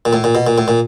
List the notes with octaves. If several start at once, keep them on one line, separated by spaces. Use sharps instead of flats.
A#2
A2
A#2
B2
A#2
A2
A#2